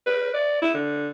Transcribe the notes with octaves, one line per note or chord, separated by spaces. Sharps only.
B4
D5
E4
D3